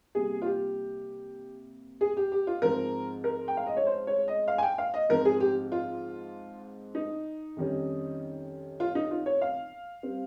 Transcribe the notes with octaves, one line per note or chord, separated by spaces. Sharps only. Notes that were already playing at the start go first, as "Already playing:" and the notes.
C3 G3 A#3 G#4
F4
G4
G#4
G4
G4
F4
G#2 F3 G#3 C4 A#4
A#4
G5
F5
D#5
C#5
C5
C#5
D#5
F5
G#5
G5
F5
D#5
G#2 F3 C4 A#4
G#4
G4
F4
D#4
F2 D#3 G3 C#4
F4
D#4
F4
C#5
F5
G3 C4